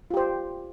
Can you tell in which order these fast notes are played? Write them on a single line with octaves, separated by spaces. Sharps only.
F4 G4 C5